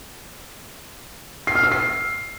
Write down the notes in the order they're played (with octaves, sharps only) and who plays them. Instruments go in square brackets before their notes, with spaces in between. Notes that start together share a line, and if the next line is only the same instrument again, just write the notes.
[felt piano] C7
F6
E6
C7